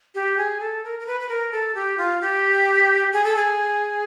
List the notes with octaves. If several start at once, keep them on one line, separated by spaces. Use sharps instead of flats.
G4
G#4
A4
A#4
A#4
B4
B4
A#4
A4
G4
F4
G4
G#4
A4
G#4